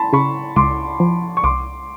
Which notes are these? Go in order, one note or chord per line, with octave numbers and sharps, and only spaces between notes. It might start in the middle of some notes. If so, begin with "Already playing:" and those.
Already playing: A5 B5 C6
C#3 B5 C#6
C#2 C6 D6
F3
C#6
C2 C6 D6